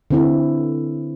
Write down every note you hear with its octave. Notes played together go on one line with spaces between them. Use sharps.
D3 C4 E4